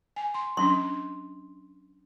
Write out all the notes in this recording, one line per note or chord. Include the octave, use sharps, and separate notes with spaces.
G#5
C6
F#3 C#4 D4 C6